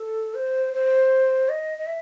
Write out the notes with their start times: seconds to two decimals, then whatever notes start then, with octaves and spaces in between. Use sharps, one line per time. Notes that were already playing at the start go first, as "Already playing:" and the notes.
Already playing: A4
0.34 C5
0.73 C5
1.49 D#5
1.78 D#5
1.86 E5